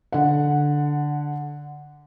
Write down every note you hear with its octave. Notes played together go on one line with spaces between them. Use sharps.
D3 F#5